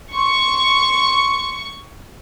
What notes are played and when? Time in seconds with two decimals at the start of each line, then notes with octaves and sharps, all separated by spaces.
0.15 C6 C#6